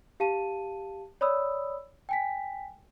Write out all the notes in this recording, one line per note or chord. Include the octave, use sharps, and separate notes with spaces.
G4 F5 A5 D#7
C#5 D5 B5 D#6 E6
G5 G#5 B6